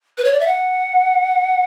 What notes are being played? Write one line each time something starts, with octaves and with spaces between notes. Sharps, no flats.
B4
C#5
D5
E5
F#5